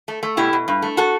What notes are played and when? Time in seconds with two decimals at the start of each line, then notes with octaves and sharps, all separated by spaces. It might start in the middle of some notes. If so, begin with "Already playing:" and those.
0.08 A3
0.23 A3
0.37 B2 E4 G4
0.53 B2
0.68 G2
0.82 A3
0.97 F#4 A4